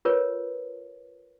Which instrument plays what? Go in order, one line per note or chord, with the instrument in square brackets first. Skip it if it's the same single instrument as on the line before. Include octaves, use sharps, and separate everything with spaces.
[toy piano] F4 A#4 B4 C#5